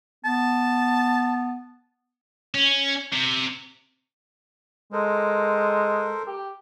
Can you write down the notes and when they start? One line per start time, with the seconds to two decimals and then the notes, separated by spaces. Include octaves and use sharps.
0.25 B3 A5
2.55 C#4
3.13 C3
4.92 G#3 A4 A#4 C5
6.27 G4